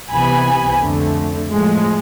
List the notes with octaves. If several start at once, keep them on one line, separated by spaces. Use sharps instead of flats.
C2 C3 E3 B3 G#5 B5
F2 D3 A3
A2 F3 G#3